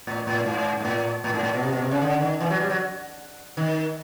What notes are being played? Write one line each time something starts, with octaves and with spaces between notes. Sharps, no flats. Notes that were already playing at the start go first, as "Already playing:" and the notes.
A2
A2
G#2
G#2
A2
A2
G#2
A2
B2
C3
B2
C3
C#3
D3
D#3
E3
F#3
G3
F#3
D#3